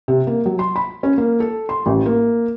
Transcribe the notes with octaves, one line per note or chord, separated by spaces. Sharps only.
C3
A#3
F#3
C6
B5
C#4
A#3
A4
C6
A1
A#3